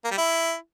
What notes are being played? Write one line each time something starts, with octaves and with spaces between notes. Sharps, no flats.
A#3
G3
E4